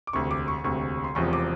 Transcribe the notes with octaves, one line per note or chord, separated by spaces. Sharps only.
D6
E1 D2 C3 C#6
D6
C#6
E1 D2 C3 C#6
C6
E1 E2 C3 F3 C#6
D6